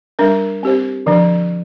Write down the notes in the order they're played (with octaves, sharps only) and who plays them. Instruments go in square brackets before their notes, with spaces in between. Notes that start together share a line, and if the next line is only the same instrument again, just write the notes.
[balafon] G3 D4 A#4
C4 G4 C5
D3 F3 D4